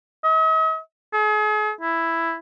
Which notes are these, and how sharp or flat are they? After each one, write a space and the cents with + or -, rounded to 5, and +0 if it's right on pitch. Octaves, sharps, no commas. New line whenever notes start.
D#5 +45
G#4 +40
E4 +5